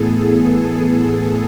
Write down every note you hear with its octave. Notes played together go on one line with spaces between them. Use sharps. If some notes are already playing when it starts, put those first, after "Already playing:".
Already playing: A2 E3 B3 G#4 A4